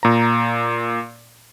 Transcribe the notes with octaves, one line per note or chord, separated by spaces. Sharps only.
A#2 A#5